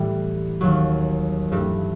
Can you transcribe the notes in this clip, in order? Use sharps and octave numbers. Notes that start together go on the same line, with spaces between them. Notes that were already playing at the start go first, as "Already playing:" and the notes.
Already playing: A2 E3 G3
D#2 D#3 F#3
G2 E3 A3